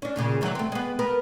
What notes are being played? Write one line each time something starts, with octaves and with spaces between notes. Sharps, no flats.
C#4 D4
D#2 A#2 C#3
D#3 E3 F#3
A3 C4
G#3 B3
B3 A#4 B4